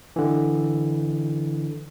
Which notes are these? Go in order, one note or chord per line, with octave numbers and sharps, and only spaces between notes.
D3 E3